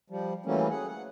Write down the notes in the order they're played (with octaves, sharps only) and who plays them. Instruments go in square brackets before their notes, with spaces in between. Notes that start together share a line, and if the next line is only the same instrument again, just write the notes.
[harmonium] F3 G3
E3 F#3 G3 A3 A#3 C#4
G#4 F#5
F#5